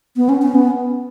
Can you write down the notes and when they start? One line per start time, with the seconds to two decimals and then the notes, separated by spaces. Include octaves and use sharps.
0.16 B3
0.29 C#4
0.42 C#4
0.55 B3